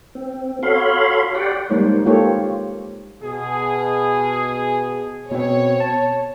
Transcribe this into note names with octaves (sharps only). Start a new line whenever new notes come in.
C4
F#4 A4 C#5 F5 B5 C6
G4 D5 F#5 G5
G3 G#3 A#3 D#4 C5 C#5
A#3 F4 G4 A4 C5 C#5
B2 G#4
B2 C4 C#5
A5